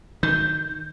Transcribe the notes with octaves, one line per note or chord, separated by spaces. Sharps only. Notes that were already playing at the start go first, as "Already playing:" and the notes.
D#3 G6